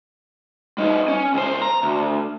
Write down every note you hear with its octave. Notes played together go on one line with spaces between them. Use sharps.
G3 D#4
C#4
C#2 C5
A#5
D2